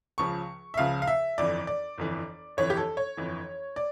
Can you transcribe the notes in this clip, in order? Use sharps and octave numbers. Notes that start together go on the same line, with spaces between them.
C#2 C#3 F3 C#6
E5
C#2 C#3 F3 F5
F5
E5
G1 F2 E3 D5
D5
G1 F2 E3
G1 F2 E3 C#5
G4
A4
C#5
G1 F2 E3
D5